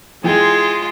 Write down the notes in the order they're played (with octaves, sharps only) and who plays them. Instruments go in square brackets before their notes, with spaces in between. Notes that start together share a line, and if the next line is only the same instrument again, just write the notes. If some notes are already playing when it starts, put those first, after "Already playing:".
[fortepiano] E3 G5 [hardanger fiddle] G#3 F4 [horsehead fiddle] G#4